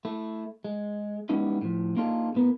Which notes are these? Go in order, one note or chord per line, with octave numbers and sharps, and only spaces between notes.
A3 E4
G#3
G3 G#3 B3 C#4 D#4 E4
A2 F3
A#3 D4 D#4 F4 G#4 A4
A2 B3 A#4